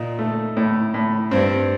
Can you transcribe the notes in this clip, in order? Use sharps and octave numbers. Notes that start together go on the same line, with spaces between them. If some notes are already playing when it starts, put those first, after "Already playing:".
Already playing: A#2 D#4
A3
A2
A2
G2 C4